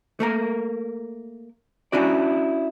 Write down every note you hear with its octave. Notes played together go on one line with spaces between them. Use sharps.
A3 A#3 A#4
C#4 D4 E4 F#4 D5